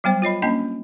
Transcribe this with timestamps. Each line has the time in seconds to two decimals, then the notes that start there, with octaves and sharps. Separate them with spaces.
0.04 F#3 G3 B3 C5 G5
0.22 F4 C#5 D#5 B5
0.42 A#3 C#4 D4 D#5 G#5